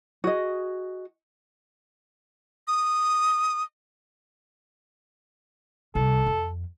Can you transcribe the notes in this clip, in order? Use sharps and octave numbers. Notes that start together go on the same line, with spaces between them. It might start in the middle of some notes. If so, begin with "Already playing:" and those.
F#4 G#4 D#5
D#6
C2 A4
F2